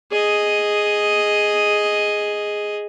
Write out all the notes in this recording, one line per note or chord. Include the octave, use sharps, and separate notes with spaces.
G#4 D#5